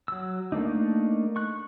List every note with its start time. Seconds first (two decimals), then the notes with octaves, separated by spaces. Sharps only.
0.08 F#3 E6
0.52 A3 A#3 D4 D#4
1.36 C#6 F#6